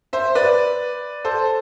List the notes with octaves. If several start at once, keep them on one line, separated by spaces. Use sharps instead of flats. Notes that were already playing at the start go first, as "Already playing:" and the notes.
C5 E5
B4 D5
A4 C5